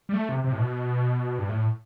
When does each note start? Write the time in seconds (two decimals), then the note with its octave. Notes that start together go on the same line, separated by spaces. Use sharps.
0.09 G3
0.14 A3
0.29 C3
0.44 C3
0.53 A2
0.59 B2
1.39 G2
1.49 A2